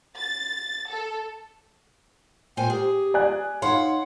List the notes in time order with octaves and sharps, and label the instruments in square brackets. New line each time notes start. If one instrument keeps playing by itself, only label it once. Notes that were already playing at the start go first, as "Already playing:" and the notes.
[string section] A6
A4
[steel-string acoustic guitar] A#2 C5 G#5 [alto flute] G5
[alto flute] G4 [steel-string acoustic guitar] G#4
[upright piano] D5 G#5 F#6
[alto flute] D#4 [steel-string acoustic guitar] C#5 F#5 [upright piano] F5 C6